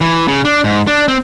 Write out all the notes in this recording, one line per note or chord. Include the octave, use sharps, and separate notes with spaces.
E3
C#3
D4
G#2
D4
C4